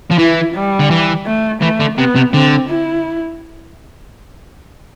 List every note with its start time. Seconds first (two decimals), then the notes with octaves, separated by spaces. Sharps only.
0.11 F3
0.19 E3 E4
0.55 G3
0.80 D3
0.91 E3
1.26 A3
1.62 E3 A3
1.80 D3
1.98 C3 B3
2.16 C3
2.33 D3 C4
2.69 E4